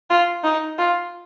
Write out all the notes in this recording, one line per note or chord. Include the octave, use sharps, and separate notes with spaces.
F4
D#4
F4